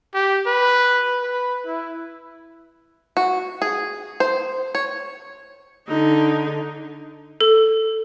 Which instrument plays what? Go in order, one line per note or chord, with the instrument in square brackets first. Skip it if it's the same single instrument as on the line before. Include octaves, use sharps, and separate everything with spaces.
[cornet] G4
B4
B4
E4
[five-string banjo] F#4
G#4
C5
C#5
[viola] D3 D#4
[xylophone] A4